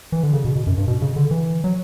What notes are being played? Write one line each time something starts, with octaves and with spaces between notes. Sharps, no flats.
E3
D3
C#3
B2
B2
F#2
G2
B2
C#3
D3
E3
F#3